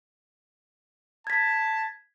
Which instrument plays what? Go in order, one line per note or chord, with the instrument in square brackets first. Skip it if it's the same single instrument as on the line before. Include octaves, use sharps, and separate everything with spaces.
[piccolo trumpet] A5 [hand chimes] G#6 B6